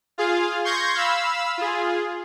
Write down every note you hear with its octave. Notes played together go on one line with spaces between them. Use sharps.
F4 G#4 F5
C6 C#6 G6 G#6 A#6
F5 B5 E6
F4 G#4